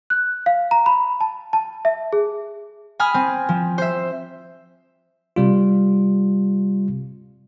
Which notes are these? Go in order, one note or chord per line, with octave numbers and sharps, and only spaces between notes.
F#6
F5
A#5
B5
A5
A5
E5
G#4
G#5 B5 D#6 F6
C4
F3
C5 E5
C3 G3 F4